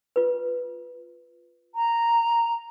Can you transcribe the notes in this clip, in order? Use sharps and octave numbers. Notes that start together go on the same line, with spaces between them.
F4 B4
A#5